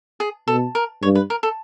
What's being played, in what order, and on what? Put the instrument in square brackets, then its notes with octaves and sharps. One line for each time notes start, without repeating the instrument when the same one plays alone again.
[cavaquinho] G#4
[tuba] B2 [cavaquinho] A4
[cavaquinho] A#4
[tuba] G2 [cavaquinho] C#5
[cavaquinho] B4
A#4
A4